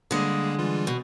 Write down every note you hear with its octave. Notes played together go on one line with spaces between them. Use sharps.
D3 G3 G#3 A#3 G#4
E3 G3 F4
B2